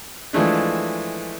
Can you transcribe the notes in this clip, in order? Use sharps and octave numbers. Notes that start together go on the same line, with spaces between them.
E3 F3 G#3 A3 D4